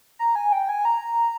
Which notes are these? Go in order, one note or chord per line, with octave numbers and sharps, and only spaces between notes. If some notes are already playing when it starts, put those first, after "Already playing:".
A#5
G#5
G5
G#5
A#5